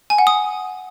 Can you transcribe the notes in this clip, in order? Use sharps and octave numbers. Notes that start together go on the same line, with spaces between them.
G#5
F#5
D#6